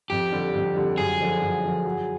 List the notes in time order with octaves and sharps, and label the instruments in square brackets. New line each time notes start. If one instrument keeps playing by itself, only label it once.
[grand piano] F2 [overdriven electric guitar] G4
[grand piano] D3 G3
F2
D3 G3
[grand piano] F#2 [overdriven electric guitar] G#4
[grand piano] D3 F3
F#2
D3 F3
F#3